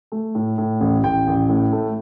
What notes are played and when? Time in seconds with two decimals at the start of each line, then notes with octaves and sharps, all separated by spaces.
0.12 A3
0.35 A2
0.58 A2
0.80 A1
1.04 A1 G5
1.27 A1
1.49 A2
1.73 A3